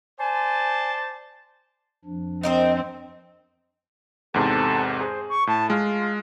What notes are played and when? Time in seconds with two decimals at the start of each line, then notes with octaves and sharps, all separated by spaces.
0.19 C5 D5 G#5 A5
2.05 F2 F3 D4
2.43 C4 D#4 A#4 C5
4.34 E2 G#2 C3 A4
5.00 G#4 C5
5.28 C#6
5.47 A2 A5
5.70 G#3 F4